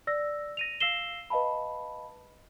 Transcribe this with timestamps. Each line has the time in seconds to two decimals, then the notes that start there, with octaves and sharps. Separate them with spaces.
0.07 D5 E6 A#6
0.57 A#6 D#7 F7
0.80 F5 E6 A#6 C7 E7 G7
1.30 B4 D#5 F5 A5 B5